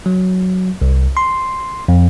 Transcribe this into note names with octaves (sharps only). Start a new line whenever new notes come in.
F#3
C2
C6
F2